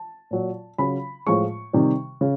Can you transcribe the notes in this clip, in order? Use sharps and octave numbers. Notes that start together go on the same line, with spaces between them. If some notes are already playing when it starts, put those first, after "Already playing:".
Already playing: A5
A#2 F#3
C#3 F#3 B5
A2 F3 G#3 C#6
C3 D#3 G3
C#3